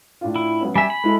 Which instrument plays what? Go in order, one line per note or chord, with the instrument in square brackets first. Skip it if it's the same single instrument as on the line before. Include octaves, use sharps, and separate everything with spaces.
[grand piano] A2 D4 F4
[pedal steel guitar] E4
[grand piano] F#3 B3 C#4
[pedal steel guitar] G3 E5 [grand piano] G#5
[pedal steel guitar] B5
[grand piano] G#3 E4 A4